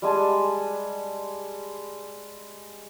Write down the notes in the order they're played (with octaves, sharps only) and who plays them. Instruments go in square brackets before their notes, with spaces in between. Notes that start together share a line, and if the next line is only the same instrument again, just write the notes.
[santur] G3 G#3 G#5 A5